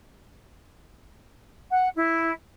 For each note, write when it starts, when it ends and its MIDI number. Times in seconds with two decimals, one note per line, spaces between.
1.70 1.89 78
1.96 2.31 64